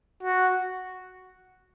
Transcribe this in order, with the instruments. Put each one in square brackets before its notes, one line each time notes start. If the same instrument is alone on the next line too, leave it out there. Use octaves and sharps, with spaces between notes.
[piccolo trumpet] F#4